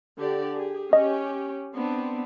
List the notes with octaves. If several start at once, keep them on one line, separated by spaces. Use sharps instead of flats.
D3 G4 D5
G4 G#4
C#4 G4 D#5
B3 C4 D4